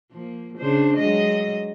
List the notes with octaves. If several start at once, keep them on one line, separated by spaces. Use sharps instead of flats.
F3 A#3
C#3 D4 C5
F#3 G#3 D#5